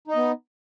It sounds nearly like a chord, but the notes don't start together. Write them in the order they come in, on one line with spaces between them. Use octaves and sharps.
D#4 D#5 B3